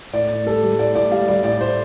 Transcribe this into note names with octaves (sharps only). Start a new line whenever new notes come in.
A2 D5
A2
G3 A4
G3
A2 D5
A2 D5
G3 F5
G3 D5
A2 D5
A2 C5